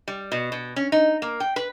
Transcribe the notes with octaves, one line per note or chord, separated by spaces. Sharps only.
G3
B2
B2
C#4
D#4
A#3
G5
B4